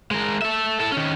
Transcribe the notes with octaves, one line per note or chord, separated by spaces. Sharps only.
G#3 A#4
A4 E5
E4 A4
D#3 C#4